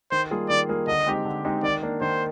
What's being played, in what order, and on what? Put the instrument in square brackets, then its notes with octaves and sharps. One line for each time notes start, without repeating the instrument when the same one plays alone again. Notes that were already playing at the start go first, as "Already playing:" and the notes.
[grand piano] D#3 [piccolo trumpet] C5
[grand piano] G3 A#3 F4 G#4
[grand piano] D#3 [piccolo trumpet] D5
[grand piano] G3 A#3 F4 G#4
[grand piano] D3 [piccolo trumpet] D#5
[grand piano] G#3 C4 D#4 G4
D3
G#3 C4 D#4 G4
[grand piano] D#3 [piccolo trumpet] D5
[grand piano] A#3 D4
[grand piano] D#3 [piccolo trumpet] C5